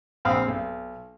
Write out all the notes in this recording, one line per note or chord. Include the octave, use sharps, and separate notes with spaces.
A#1 C4 F5 B5 D#6
B1